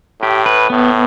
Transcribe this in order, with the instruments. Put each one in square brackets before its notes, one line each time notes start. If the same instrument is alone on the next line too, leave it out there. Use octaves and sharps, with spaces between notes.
[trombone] A2 [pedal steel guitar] G4
[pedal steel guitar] B4
[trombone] A2 [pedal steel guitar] B3